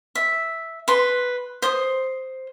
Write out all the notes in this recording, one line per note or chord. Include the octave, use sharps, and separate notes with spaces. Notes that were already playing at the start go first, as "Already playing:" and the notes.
E5
B4 C6
C5 D#6